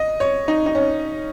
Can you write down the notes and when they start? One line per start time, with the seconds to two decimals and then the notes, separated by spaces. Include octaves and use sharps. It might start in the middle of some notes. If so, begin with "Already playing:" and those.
Already playing: D#5
0.20 C#5
0.48 D#4
0.66 D#4
0.75 C#4